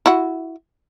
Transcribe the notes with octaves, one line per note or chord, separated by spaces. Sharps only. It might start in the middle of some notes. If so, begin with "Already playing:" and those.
E4 F#4